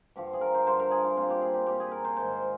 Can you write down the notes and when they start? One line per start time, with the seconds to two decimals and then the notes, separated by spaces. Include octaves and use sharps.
0.16 G2 D3 F3 G4
0.33 G#4
0.41 A#4
0.54 C5
0.66 G2 D3 F3 C5
0.79 A#4
0.91 G#4
1.04 F4
1.16 A#2 G3 C4 F4
1.30 G4
1.41 G#4
1.54 G4
1.66 A#2 G3 C4 G4
1.80 G#4
1.91 A#4
2.05 C5
2.17 G#2 D#3 G#3 C5